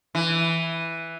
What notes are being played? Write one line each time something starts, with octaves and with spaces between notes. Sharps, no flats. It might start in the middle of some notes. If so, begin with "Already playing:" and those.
E3